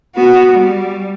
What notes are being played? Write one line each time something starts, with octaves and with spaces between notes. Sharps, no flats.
B3 F#4
G3